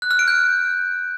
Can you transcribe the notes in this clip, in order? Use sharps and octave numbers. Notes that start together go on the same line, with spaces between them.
F#6
F6
D7
G6